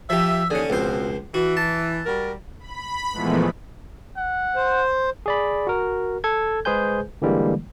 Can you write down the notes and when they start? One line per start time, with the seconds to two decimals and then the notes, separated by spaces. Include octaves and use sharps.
0.10 F3 G4 E5
0.51 D#2 D3 C#4 G#4
0.70 C#2 B2 F3 C4 C5
1.34 E3 F#4
1.57 A5
2.06 G3 F#4 A#4
2.59 B5
3.12 A#2 E3 F3 G#3 A3 B3
4.17 F#5
4.55 C5
5.26 G#4 D5 B5
5.67 F#4 A#4
6.24 A4 G#6
6.65 G#3 G#4 B4 C5 G#5 G6
7.22 D3 E3 G3 G#3 A#3